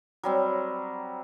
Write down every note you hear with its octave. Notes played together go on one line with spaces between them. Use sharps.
F#3 G3 C4